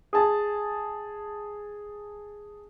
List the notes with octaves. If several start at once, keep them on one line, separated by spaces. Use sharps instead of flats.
G#4 A5